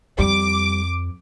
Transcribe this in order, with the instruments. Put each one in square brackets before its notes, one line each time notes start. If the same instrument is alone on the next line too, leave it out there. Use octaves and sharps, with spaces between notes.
[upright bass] F2 [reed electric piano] G3 [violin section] D6